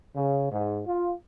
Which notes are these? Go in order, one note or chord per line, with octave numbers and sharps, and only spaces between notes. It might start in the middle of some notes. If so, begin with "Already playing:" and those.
C#3
G#2
F4